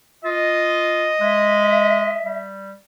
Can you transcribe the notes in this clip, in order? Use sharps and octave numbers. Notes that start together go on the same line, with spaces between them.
F4 D#5
G#3 E5
G3